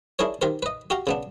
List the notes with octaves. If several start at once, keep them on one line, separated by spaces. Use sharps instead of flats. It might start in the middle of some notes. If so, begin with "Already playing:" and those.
D4 E4 G#4 A#4 C#5
D#3 G4 A#4 C5
B4 D#5
F#4 G4 F5 G5 A#5
C#3 B3 D4